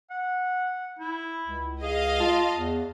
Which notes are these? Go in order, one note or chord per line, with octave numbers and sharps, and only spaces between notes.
F#5
E4
C#2
G#4 D#5 F5
F4 A5
E2